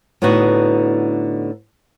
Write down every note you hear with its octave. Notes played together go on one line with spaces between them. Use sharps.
A2 D3 B3 D#4 F#4